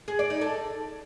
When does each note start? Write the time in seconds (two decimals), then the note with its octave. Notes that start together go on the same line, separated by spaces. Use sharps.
0.08 G#4
0.19 D5
0.30 D#4
0.41 A4